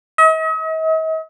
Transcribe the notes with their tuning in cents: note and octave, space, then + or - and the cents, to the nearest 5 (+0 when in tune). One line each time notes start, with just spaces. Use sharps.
D#5 +45